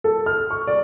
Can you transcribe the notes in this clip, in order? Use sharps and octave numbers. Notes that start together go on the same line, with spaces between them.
A4
F6
C#6
D5